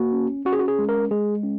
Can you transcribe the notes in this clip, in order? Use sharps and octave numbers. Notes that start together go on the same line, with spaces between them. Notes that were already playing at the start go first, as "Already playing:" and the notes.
Already playing: A#3 F#4
C#4
C#4 F#4
G#4
F#4
G#4
G#3
A#4
G#3 G#4
C#4